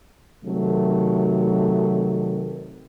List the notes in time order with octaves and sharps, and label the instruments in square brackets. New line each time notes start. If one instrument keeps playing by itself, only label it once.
[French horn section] C3 D#3 F#3 A3